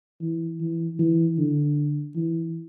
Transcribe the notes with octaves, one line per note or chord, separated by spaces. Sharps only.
E3
E3
E3
D3
E3